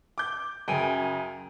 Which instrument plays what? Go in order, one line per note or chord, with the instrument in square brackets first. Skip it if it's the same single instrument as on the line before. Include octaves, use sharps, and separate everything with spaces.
[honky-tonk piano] D6 G6
[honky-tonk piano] F#2 C#3 [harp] G5 G#5